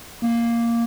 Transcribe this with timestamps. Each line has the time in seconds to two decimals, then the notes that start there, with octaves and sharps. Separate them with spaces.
0.22 A#3